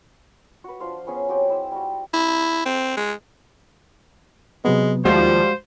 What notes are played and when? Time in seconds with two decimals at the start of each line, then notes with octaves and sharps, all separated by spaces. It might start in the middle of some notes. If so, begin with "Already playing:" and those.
0.64 F#4 B4
0.80 F3 D4 C5 F5
1.07 B3 C#4 G#4 G#5
1.29 F#3 C4 G4
1.48 G#3 E4 E6
1.72 G3 F#4
2.14 E4
2.66 C4
2.97 G#3
4.65 C3 F#3 G#3 B3
5.05 D#2 F3 G3 G#3 F#4 C5 F5